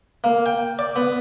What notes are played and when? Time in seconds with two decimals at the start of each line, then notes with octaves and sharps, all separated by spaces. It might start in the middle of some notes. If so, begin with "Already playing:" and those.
0.24 A#3
0.46 G5
0.79 D5
0.96 B3